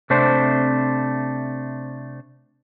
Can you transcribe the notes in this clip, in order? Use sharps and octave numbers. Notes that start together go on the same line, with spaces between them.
C3 A3 C4 D4 C5